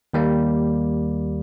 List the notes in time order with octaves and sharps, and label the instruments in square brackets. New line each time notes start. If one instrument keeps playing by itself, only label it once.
[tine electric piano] D#2 G3 A#3